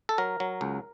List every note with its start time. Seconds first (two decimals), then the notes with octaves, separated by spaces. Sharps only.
0.09 A4
0.18 F#3 A#4
0.40 F#3
0.61 C#2